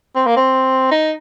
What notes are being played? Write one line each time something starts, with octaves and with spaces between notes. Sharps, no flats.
C4
A#3
C4
D#4